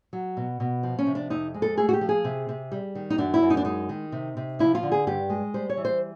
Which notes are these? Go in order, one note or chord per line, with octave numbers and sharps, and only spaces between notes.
F#3
B2
B2
F3
C#4
C3
D4
F2 D#4
G#3
A4
A3 G#4
F#4
G4
F3
G#4
C3
C3
G3
D#3
D#4
F#2 D4
E4
F#2
D#4
D4
G#3 D#4
D#3
C3
C3
F3 E4
F4
D3
G#4
G2 G4
G#3
G3 C5
C#5
E3
C5